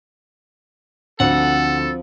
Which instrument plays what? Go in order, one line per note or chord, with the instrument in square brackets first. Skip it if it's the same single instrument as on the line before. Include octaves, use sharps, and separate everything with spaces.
[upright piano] D2 [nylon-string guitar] F3 C4 [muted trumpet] A4 [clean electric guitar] F#5